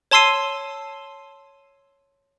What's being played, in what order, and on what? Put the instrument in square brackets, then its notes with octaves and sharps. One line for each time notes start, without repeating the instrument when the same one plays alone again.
[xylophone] C#5 A5 C6 E6 C7 D#7